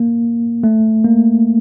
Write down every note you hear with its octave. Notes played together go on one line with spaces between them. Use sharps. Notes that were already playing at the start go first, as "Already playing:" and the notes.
Already playing: A#3
A3
A#3